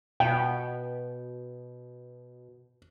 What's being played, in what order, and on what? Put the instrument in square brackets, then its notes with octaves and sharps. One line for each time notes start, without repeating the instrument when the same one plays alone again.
[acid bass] B2 [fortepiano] G5